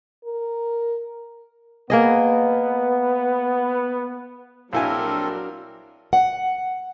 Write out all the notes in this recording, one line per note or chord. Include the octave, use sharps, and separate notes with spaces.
A#4
A#3 B3 G#4 D#5
A#1 F#3 C4 D4 E4 A4 A#4 G#5
F#5